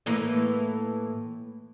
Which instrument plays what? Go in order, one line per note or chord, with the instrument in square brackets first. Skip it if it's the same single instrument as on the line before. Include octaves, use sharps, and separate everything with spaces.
[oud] A2 E3 A#3